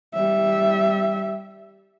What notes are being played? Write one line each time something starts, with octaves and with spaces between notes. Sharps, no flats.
G3 E5